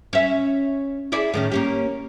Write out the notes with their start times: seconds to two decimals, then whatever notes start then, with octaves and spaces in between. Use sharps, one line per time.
0.13 C#4 E5
1.12 E4 G#4 D5
1.34 A2 D#3 C#4
1.52 A#3 C#4 G4